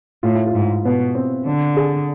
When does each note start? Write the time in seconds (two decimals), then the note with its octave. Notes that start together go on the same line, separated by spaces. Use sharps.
0.23 A2 F4
0.35 E4
0.47 F4
0.54 G#2
0.85 B2 B3
1.15 C4
1.46 D3 D4
1.76 G#4